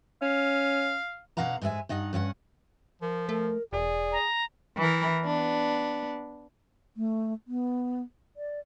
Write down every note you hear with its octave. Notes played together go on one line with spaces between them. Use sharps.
C#4 F5
B2 D3 F5 F#5 A#5
G#2 G#3 A4 E5 G#5
G2 D#4 D#5 F#5
G2 C#4 G4 F#5
F3 A#4
A3 A#4
E1 G#4 D5
A#5
E3 E4 A#4
B3 D4
A3
B3
D5